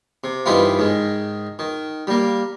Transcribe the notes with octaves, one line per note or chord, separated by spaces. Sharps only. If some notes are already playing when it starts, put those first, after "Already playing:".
C3
G2 D#3 E3 C4 E4 F4
G#2 D#3
D#3
G3 A#3